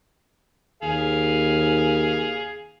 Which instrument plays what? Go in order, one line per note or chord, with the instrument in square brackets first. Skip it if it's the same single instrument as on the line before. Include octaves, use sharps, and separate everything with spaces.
[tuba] D#2 [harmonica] G#4 F5